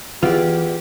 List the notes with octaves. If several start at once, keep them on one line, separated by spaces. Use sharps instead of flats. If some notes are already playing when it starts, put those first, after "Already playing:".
E2 E3 F4 G4 D5